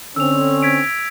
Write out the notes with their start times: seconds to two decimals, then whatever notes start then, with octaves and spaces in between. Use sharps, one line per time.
0.16 D3 C4 C#4 E6 F7
0.62 G#6 B6 D7